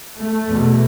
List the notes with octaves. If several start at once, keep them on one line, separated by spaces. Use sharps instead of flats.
A3
E2 B2